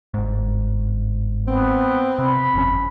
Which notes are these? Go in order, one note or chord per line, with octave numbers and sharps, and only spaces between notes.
G1 G#2
B3 C4
C3 B5
G1 F2 C#4